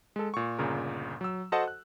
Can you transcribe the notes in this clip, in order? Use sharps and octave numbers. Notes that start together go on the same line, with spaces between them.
G#3 A4
A#2 C#6
G1 A#2 C#3 A#4
F#3 E6
F#4 A4 C5 D#5 F#5 A5
F#6